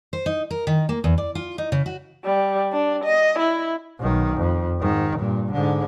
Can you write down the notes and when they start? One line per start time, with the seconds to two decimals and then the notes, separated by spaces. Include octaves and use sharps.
0.13 C5
0.26 D#4
0.51 A#4
0.67 D#3
0.89 A#3
1.04 E2
1.18 D5
1.35 F4
1.58 D#4
1.72 C#3
1.86 F#4
2.25 G3
2.72 D4
3.04 D#5
3.39 E4
3.99 B1 D#3
4.37 F2
4.79 G#2 D#3
5.17 G2 A#2
5.52 G#2 D3